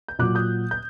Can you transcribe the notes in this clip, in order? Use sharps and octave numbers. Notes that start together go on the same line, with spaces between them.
G6
A#2 F#3 D6 F#6
D#6 G6
G6